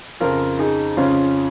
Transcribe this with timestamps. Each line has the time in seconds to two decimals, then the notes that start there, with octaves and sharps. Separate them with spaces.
0.20 F2 C#3 F4 A#4
0.59 D#4 G#4
0.97 F2 C#3 C#4 F4